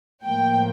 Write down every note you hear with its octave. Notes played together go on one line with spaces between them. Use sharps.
A2 F3 A#3 G5